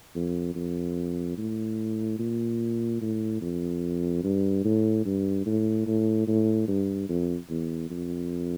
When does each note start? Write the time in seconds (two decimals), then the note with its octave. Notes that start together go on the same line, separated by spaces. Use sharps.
0.15 F2
0.55 F2
1.38 A2
2.19 A#2
3.01 A2
3.41 F2
4.24 G2
4.64 A2
5.05 G2
5.46 A2
5.87 A2
6.27 A2
6.68 G2
7.09 F2
7.50 E2
7.90 F2